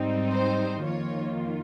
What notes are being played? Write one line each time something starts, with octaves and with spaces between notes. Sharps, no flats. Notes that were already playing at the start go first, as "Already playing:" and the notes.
Already playing: G#2 G3 C4 D#4
C5
F2 D#3 A#3 F4 C#5